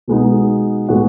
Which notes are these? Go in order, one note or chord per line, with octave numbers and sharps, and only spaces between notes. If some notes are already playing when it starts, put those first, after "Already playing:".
B2 G#3 B3 D#4
A2 G#3 B3 D#4 F#4